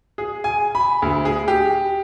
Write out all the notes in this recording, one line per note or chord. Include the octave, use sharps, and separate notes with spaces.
G#4
G#5
B5
D2
G#4
G4